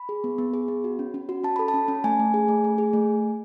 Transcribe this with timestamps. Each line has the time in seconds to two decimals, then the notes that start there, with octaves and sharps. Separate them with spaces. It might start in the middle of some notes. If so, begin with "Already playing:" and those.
Already playing: B5
0.09 G#4
0.24 B3
0.38 B3
0.53 G#4
0.68 B3
0.84 F#4
0.99 C#4
1.14 C#4
1.29 F#4
1.44 C#4 A5
1.56 A4 B5
1.68 A5
1.74 C#4
1.88 C#4
2.04 A3 G#5
2.19 A3
2.34 G#4
2.48 A3
2.64 A3
2.78 G#4
2.93 A3